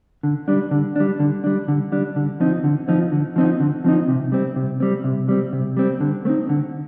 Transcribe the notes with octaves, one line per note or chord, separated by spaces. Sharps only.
D3
G3 D4
D3
G3 D4
D3
G3 D4
D3
G3 D4
D3
F3 C4 D#4
D3
F3 C4 D#4
D3
F3 C4 D#4
D3
F3 C4 D#4
C3
G3 C4
C3
G3 C4
C3
G3 C4
C3
G3 C4
D3
A3 C4 D#4
D3